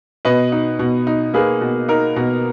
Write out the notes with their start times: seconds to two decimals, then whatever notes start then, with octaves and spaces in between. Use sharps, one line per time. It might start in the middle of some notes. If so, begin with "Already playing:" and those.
0.25 B2 B4 D#5
0.52 D#4
0.79 B2
1.07 D#4
1.34 A#3 G#4 B4
1.61 B2
1.88 D#4 A#4
2.16 B2